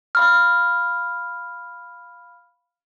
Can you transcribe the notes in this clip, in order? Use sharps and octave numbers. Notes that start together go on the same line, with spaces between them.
F5 B5 F6